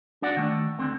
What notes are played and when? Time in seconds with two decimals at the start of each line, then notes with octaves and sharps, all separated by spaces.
0.22 D4 F#4 D5 F#5
0.37 D#3 A3
0.79 D2 D3 C4